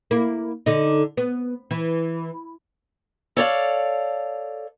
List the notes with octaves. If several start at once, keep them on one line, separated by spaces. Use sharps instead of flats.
A#3 E4
D3 D#4
B3
E3
A4 C#5 D5 F5